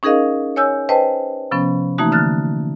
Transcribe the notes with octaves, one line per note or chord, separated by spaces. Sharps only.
C#4 D#4 G#4 A#4 D#5 F5
C#5 G#5 E6 G6
B4 C5 D#5 G5 A5
C3 F3 B3 C#4
E3 A3 A#3 D#4 F#4
D3 F6 F#6 A6